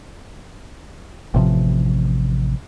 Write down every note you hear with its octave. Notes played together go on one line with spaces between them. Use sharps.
A1 C3 E3 F3